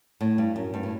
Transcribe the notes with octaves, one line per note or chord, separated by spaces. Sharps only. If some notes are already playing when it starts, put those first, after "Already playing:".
A2
G2
F#2
G2
A2